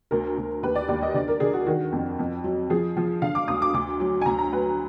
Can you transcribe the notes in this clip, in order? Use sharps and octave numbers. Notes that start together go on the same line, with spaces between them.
D2 A#4
D2
D#2 B4
D5
D#2 D5
D#5
D3 D5
A#4
D3 G#4
F#4
D#3 F#4
F2
F2
F#3
F3 G#4
F3
D3 F5
D6
D2 D#6
D6
D2 D6
F#3
G#5
D2 A#5
A#5
F#3 B4